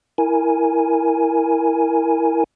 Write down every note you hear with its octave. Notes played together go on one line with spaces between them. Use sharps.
E4 A#4 G#5